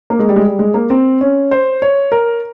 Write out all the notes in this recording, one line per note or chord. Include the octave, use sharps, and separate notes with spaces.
A#3
G#3
G3
G#3
G3
G#3
A#3
C4
C#4
C5
C#5
A#4